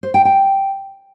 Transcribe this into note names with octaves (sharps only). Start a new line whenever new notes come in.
C5
G5
G5